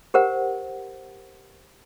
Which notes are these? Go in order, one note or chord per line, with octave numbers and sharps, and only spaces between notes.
G4 A#4 C5 F#5